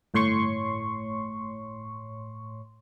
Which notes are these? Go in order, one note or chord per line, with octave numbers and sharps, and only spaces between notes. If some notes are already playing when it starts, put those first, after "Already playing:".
G1 A2 C#5 C6 C#6